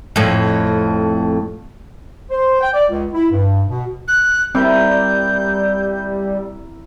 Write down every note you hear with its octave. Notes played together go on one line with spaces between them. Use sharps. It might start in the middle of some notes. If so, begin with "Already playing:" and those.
F2 A2
C5
G5
D5
C#2
E4
G2
B2
F#6
G3 C4 E4 A#4 G6